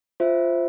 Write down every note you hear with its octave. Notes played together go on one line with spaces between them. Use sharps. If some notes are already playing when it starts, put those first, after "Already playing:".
F4 C5 E5